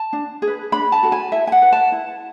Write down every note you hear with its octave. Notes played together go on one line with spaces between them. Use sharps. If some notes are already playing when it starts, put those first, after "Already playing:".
Already playing: A5
D4
G#4
B4
D4 B5
A5
F#4 A4
G#5
E4 E5
G#5
F#5
B4
A5
E4